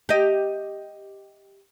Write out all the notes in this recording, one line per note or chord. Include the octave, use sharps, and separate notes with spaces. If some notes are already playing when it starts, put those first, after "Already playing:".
G4 D#5